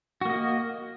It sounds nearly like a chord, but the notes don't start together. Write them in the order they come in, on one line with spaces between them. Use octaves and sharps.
F#4 A#3 D#5